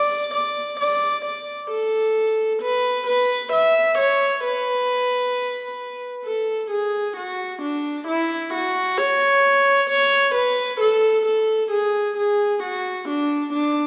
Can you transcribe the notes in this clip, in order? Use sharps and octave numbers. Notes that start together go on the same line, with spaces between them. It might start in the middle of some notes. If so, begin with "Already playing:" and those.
Already playing: D5
D5
D5
D5
A4
B4
B4
E5
C#5
B4
A4
G#4
F#4
D4
E4
F#4
C#5
C#5
B4
A4
A4
G#4
G#4
F#4
D4
D4